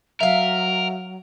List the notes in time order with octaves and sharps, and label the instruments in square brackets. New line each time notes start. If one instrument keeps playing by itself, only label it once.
[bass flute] F#3 [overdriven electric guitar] A#4 [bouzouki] E5 F5